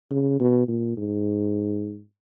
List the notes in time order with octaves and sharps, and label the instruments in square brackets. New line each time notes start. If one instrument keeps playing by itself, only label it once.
[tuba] C#3
B2
A#2
G#2